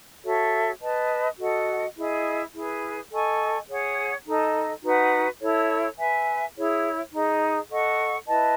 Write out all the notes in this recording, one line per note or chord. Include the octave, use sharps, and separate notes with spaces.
F#4 A4 C#5 E5
B4 D#5 A5
F#4 A4 D#5 F#5
E4 G#4 D#5
E4 G#4 B4
A4 D#5 G#5 C#6
G#4 C#5 F#5
D#4 A4 D#5
D#4 F#4 B4 F#5
E4 A4 C#5
B4 E5 G#5
E4 G#4 C#5
D#4 G#4 D#5
A4 D#5 F#5 C#6
E4 B4 D#5 A5